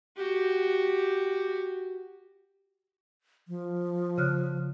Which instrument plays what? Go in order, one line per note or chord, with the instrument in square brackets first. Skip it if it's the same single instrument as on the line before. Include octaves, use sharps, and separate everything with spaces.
[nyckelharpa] F#4 G4
[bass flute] F3
[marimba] C#3 F6 F#6